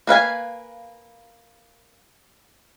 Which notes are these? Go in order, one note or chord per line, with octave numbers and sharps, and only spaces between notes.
A#3 B4 F5 G#5